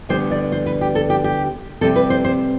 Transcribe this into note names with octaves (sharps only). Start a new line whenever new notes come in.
D2 D3 G3 B3 C5
D5
C5
B4
G4
A4
G4
G4
C3 G3 C4 A4
B4
C5
C5